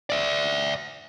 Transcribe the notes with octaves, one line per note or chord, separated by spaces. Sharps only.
D5 E5